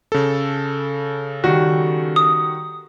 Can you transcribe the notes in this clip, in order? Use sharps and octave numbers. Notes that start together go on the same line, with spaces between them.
C#3 A4
D#3 G3 F#4
D#6